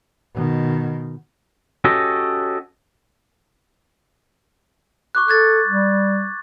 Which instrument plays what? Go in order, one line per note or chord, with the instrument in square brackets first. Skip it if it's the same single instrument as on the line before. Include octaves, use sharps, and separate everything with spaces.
[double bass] B2 D#3
[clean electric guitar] C#4 F#4 G4 A4 C#5 D#5
[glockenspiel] C#6 D6 F#6
[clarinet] A4 [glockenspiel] F#6 G#6 A6
[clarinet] G3